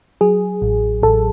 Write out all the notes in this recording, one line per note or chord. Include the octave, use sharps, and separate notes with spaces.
F#3 G#4
A1
A1 A4